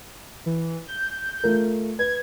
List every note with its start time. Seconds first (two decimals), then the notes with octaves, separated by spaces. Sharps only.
0.46 E3
0.87 G6
1.44 A3 F4 A#4
1.99 B4 G#6